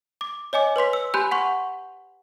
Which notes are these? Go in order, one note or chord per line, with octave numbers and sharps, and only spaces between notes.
D6
C#5 D#5 G#5 D6
B4 C#5 C6 B6
E6
G4 G#5 B5 C6 F#6 G6
F#5 C6 C#6